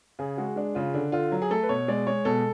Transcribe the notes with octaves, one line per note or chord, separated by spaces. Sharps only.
C#3 G#4
G#3 F#4
G#3 D4
C#3 F4
D3 D4
D3 F4
F#3
G#4
A3 A4
B4
B2 C#5
G#3 D5
G#3 C#5
B2 A4